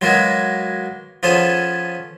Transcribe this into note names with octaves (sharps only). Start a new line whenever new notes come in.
F#3 G#3 A#3 B3 F#4
F3 B3 C#4 G#4 A4